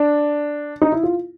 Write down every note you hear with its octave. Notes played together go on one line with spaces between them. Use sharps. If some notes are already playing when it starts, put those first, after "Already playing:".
Already playing: D4
D#4
E4
F4